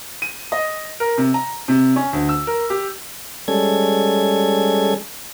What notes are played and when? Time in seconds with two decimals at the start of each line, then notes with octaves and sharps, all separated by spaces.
0.22 D#7
0.52 D#5
1.00 A#4
1.18 C3
1.34 A#5
1.68 C3
1.96 C#4
2.13 D2
2.29 E6
2.47 A#4
2.70 G4
3.48 G3 G#3 C#4 A4 G#6